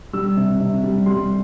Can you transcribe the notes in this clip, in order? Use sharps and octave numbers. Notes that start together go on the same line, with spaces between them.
G3 E6
C3
C3
G3
G3 C6